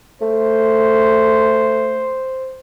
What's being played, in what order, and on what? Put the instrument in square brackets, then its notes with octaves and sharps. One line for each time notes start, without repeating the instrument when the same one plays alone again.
[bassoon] A3 [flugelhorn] C5